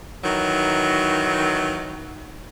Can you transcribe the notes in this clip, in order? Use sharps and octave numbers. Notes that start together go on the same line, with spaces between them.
D#3 E3 F#3